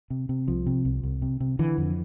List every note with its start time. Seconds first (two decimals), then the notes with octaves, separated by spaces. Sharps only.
0.10 C3
0.29 C3
0.48 C2 F3
0.67 C3
0.85 C2
1.03 C2
1.22 C3
1.40 C3
1.59 D3 E3
1.78 F2